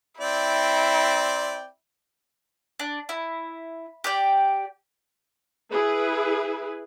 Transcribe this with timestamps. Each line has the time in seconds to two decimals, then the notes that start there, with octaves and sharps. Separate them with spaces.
0.21 C4 E4 D5 G5
2.80 D4
3.09 E4
4.04 G4 D5 G5
5.71 E4 G#4 B4